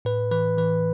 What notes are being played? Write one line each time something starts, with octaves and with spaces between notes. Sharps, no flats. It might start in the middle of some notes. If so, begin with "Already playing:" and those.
A2 B4
E3 B4
E3 B4